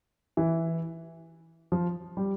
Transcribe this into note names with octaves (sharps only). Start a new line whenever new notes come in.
E3
F3
G3